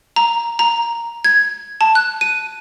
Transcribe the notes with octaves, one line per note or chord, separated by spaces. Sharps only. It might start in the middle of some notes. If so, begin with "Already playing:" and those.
A#5
A#5
G#6
A5
F#6
D#7